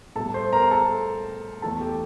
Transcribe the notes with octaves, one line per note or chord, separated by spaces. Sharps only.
A2 G3 A4 A5
C5 C6
A#4 A#5
A4 A5
E2 E3 A3 A4 A5
G4 G5